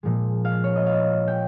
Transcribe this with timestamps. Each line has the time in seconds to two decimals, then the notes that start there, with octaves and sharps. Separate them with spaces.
0.03 A#2 F3 G#3
0.45 F5
0.64 C#5
0.76 D#5
0.86 F5
1.27 G5